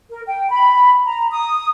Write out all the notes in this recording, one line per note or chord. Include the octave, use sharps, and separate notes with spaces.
A#4
G5
B5
A#5
D#6